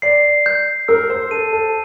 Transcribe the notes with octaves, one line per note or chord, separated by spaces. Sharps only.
D5 C7
G6
A#4 E6
C5
A4 D#7
A4